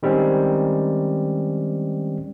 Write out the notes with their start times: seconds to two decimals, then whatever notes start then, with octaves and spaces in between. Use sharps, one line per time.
0.03 D#3 G3 G#3 C4 C#4